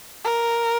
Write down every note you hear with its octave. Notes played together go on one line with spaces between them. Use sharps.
A#4